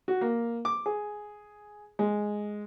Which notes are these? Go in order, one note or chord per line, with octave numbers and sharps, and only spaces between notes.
F#4
A#3
D6
G#4
G#3